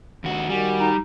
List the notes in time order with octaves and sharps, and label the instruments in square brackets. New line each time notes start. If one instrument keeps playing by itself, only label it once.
[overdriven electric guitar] D#2 F#4
[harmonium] D#3 F#4 G#5 [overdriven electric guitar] G3
[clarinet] D#4